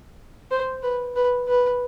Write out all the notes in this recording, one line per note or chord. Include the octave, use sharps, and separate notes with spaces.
C5
B4
B4
B4